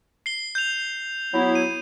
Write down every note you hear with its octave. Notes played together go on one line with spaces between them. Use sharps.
C7 G7
G6 F7
F#3 B3 E4
D#7